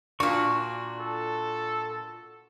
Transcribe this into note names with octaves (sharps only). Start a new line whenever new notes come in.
A#2 D4 F#4 C#6
A4